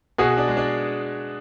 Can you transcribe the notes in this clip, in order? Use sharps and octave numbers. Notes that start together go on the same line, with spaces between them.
B2 F#4 G#4
D4
G#3
D4